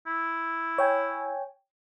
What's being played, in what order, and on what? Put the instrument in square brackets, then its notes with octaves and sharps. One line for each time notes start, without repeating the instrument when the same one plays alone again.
[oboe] E4
[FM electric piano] C#5 G5 G#5